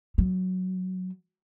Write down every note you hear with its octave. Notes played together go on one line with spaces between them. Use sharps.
F#3